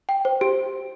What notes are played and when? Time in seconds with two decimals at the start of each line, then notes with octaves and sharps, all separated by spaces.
0.09 G5
0.25 C5
0.41 G4